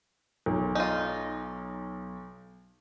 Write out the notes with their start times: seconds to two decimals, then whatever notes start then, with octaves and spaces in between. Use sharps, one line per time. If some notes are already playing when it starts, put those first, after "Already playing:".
0.46 B1
0.75 D#4 F4